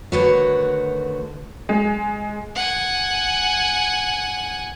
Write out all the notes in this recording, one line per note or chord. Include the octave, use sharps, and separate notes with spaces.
D2 D3 D#3 F#4 B4 C#5
G#3
F#5 G#5